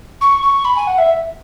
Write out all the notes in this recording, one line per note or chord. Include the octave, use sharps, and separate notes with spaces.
C#6
C#6
B5
G#5
F#5
E5